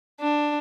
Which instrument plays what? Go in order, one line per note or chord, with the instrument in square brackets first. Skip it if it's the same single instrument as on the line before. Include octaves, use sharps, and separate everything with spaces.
[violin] D4